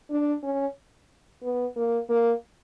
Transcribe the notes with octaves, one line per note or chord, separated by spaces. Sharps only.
D4
C#4
B3
A#3
A#3